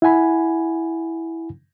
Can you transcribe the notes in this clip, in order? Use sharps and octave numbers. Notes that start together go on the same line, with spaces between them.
E4 F#5 G#5 B5